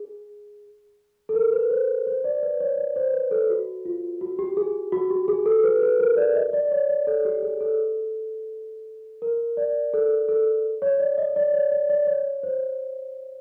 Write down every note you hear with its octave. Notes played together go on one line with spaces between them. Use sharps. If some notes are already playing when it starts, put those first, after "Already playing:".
Already playing: G#4
A4
A#4
B4
C5
C5
D5
B4
C#5
D5
C5
B4
A4
F#4
F4
F#4
G4
G#4
F#4
G4
G#4
A4
B4
B4
A#4
D5
D#5
D5
C#5
D5
A4
G4
G#4
A4
A#4
D5
A4
A4
C#5
D5
D#5
D5
C#5
D5
D5
C#5
C5